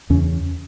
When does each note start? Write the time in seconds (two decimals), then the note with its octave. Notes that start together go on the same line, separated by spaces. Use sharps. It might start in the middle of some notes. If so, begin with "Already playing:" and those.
0.10 E2 C#3 C#4